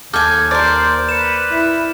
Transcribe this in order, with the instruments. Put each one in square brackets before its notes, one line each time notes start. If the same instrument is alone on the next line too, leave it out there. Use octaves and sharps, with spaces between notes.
[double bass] D#2 [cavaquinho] A4 G#5 [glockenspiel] D6 F6 G6
[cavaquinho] A#4 D5 [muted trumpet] C5 [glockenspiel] F6
[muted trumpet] B4 [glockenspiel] C#7 E7
[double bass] E4